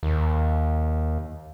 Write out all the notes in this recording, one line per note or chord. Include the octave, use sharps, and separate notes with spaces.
D#2